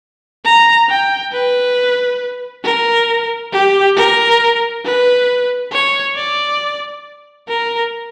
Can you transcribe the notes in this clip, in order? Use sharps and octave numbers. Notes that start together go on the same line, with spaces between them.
A#5
G5
B4
A#4
G4
A#4
B4
C#5
D5
A#4